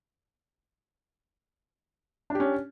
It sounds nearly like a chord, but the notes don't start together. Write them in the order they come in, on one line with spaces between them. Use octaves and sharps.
D4 G4 C#4